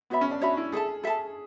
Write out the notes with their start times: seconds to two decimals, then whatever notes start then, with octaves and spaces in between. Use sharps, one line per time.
0.10 B3 F#4 C#5 E5 B5
0.21 C#4
0.31 D4
0.41 D4 F#4 C#5 E5 B5
0.57 E4
0.72 G#4 A4 E5 A5
1.04 A4 E5 A5